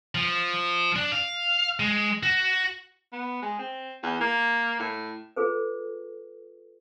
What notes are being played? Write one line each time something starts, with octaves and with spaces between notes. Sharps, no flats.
F3
D4
F5
G#3
F#4
B3
G#3
C4
E2
A#3
A2
F4 G#4 A4 B4